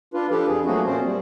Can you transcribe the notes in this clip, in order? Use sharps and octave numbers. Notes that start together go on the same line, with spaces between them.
D4 F4 B4
F3 D4 G4 A4 B4
F2 G#4
F3 F#3 A3 A#3 F#4 G#4
A#2 C4 C#4 C5
G3